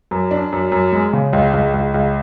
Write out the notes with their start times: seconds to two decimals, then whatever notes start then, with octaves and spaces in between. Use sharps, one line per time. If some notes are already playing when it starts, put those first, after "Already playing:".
0.11 F#2
0.31 D4
0.52 F#2
0.72 F#2
0.92 G#3
1.13 C#3
1.33 C#2
1.53 C#2
1.74 C#2
1.94 C#2